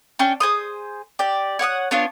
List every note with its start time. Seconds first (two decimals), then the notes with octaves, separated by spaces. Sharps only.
0.19 C#4 D4 G5
0.40 G#4 C5 D#6
1.19 G4 D5
1.59 C#5 F#5 D6 D#6
1.91 B3 D4 F4 C#5